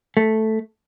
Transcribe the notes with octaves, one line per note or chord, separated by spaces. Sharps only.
A3